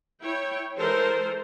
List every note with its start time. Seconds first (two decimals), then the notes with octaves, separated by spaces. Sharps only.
0.21 E4 C#5 G5
0.77 E3 G#3 A4 A#4 C5